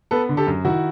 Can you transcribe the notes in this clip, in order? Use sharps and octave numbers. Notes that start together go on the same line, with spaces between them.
B3 A4 B4
D3
G4 A4
F#2
D#3 E4 F#4